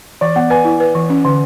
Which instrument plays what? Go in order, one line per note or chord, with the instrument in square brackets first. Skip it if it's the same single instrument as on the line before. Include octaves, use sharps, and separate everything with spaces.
[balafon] E3 [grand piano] D5
[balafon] B3 [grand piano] F#5
[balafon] B4 [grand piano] G#5
[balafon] E4
B4
E3
C#4
D3